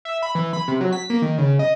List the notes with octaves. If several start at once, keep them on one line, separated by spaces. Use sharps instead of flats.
E5
B5
E3
B5
C3
F#3
B6
A#3
D#3
C#3
D#5